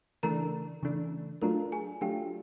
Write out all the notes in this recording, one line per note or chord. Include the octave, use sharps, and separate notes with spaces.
C#3 E3 A3 D4 A#4 A#5
C#3 E3 A3 D4
F#3 A3 D4 F4 A#4 A#5
G#4 G#5
F#3 A3 D4 F4 G4 G5